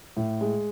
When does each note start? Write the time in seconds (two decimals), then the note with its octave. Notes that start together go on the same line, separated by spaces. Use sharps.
0.17 A2
0.41 G#3